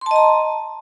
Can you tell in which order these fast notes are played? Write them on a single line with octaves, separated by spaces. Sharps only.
C6 A5 D#5 A#5